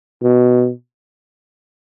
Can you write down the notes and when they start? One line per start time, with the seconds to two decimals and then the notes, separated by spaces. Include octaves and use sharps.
0.22 B2